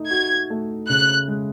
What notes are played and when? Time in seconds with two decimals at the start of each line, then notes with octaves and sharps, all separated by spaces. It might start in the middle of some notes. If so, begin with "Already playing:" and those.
Already playing: A3 D#4
0.11 F#4 G#6
0.50 A3
0.88 C#3 F#6
1.28 G#3